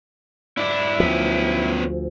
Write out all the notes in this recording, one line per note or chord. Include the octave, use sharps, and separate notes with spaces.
G#2 D4 E4
D2 F3 B3 C#4